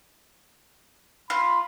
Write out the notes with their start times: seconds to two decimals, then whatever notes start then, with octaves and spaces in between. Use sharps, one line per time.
1.30 F4 B5